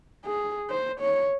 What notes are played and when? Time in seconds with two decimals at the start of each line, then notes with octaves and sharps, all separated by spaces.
0.25 G#4
0.70 C5
1.00 C#5